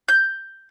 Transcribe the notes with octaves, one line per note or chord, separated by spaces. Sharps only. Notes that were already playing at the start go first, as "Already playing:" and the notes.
G6